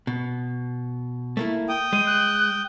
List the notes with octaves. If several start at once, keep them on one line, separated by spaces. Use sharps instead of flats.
B2
A3 A#3 E4
G5 D#6
G#3 D#7
F#6